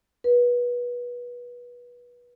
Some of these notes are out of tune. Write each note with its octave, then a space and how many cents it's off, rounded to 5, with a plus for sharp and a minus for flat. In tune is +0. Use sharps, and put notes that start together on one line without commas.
B4 -25